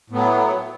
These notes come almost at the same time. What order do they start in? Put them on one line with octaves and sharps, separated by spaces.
A2 B3 F#3